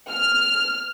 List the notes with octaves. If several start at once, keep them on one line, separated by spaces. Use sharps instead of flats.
F6